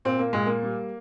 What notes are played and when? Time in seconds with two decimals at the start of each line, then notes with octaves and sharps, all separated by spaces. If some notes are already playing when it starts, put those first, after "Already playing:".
0.05 A#2 C4
0.19 A#3
0.33 A#2 G#3
0.46 A#3
0.63 G3